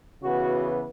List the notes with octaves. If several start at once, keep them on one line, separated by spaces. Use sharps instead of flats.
C#3 E3 B3 F#4